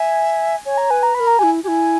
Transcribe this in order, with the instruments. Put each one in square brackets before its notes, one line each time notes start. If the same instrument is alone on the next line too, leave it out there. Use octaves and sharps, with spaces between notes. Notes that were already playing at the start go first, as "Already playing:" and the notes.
Already playing: [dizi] E5 [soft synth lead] G#5
[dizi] C#5 [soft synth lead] G#5
[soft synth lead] A#5
[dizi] B4 [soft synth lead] G#5
[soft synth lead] A#5
[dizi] B4 [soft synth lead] B5
[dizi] A#4
[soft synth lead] A#5
[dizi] G4 [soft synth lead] G#5
[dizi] E4
[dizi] G4 [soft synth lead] G#5
[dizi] E4